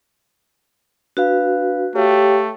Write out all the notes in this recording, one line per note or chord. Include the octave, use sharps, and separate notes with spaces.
D4 F#4 B4 F5
A3 G4 C#5 F5